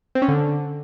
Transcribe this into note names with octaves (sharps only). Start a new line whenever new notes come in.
C4
C#4
D3